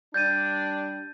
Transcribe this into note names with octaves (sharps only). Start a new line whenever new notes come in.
G3 D4 G6 A6 D#7